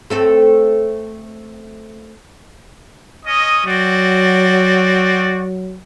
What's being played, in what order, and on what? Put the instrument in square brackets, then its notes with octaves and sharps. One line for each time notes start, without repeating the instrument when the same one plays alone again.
[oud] A3 C4 A4
[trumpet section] C#4 D#5
[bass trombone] F#3 [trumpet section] C4 F#4 D5